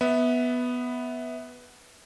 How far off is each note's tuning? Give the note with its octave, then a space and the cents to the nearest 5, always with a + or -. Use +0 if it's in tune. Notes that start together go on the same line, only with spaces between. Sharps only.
B3 +0 E5 -20